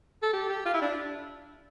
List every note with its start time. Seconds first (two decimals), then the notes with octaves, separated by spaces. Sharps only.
0.22 A4
0.33 G4
0.49 G4
0.65 F4
0.74 E4
0.82 D4